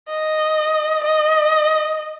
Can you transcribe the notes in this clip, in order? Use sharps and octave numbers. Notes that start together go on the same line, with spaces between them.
D#5
D#5